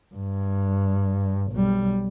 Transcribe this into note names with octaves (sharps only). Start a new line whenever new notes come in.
G2
B1 G3